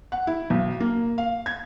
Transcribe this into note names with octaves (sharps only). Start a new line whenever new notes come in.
F#5
E4
B1
A#3
F5
G#6